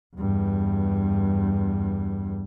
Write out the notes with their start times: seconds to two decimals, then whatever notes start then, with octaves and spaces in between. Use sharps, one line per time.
0.16 E2 G2